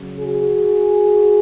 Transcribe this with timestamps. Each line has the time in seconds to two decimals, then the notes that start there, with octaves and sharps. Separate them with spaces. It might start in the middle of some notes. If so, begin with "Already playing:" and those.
Already playing: C#3 F#3
0.20 F#4 G#4